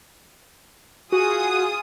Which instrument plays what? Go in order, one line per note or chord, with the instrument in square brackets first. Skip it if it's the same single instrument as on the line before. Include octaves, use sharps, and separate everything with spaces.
[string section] F4 G#4 D#6 [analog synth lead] F#4